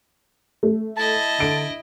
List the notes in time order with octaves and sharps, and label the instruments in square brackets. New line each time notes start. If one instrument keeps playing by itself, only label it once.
[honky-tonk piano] A3
[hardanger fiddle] E4 D#5 [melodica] A5
[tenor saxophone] D3 [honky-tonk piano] D7